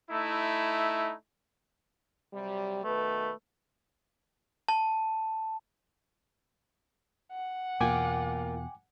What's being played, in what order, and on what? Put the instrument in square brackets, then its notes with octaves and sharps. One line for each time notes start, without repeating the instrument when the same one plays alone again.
[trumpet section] A3 D#4 E4
[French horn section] C3 F#3 G3
[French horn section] B2 D#3 B4 [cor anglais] A3
[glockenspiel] A5
[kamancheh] F#5
[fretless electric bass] E2 B2 [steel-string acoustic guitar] A#3 F4 [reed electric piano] G5 G#5 D6